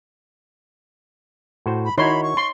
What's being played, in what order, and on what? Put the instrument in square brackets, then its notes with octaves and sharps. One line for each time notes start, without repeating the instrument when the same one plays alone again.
[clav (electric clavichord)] A2 F#4 C5
[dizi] B5
[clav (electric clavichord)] D#3 E4 F#4 [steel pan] D#4 C#5 C6 [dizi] B5
[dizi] C#6
[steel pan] C6